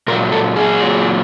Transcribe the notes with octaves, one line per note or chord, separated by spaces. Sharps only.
A#2 F#3 A#4
A4
G#4
A#2 F#3